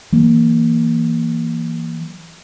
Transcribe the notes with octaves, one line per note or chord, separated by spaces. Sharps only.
E3 F#3 A#3